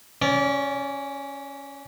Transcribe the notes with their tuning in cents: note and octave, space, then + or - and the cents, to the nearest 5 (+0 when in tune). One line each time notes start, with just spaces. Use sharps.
C#4 +0 D5 -30